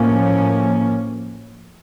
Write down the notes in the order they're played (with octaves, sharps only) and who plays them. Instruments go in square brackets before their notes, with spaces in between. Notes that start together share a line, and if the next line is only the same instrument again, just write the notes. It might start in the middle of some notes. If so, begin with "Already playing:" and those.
Already playing: [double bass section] A2 F3 A#3 C#4